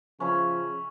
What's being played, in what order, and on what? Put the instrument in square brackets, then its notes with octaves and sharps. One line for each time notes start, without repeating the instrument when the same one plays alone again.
[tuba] C#3 [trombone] F3 [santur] C#4 E5 B5